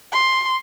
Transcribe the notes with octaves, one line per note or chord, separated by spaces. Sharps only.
C6